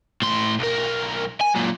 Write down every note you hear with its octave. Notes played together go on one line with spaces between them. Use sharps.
A2 C6
B1 A#4
G#5
F#2 A#2